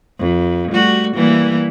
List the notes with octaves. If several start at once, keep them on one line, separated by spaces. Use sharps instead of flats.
F2
G3 A3 F#4
E3 G3 A#3